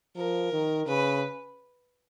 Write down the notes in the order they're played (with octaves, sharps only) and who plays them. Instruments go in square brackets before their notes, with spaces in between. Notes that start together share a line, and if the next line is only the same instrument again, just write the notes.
[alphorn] F3 [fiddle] A#4
[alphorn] D#3
[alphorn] C#3 [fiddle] B4